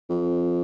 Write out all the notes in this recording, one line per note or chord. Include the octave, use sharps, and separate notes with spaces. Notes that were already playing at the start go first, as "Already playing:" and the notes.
F2